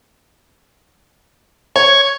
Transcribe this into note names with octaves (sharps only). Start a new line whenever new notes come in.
C#5 C#6 G#6